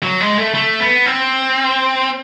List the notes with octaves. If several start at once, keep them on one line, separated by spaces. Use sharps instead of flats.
F#3
G#3
A3
A3
B3
C4